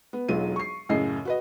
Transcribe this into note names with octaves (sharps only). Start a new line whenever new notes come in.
B3
E1 B1 F#3 F4 D#7
C#6 C7
F#2 A2 C#3 D#5 C7
F#4 B4 D#5